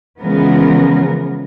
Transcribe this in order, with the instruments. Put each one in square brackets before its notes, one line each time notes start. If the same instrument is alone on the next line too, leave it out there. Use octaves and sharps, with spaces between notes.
[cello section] C#3 E3 F3 G#3 B3 A#4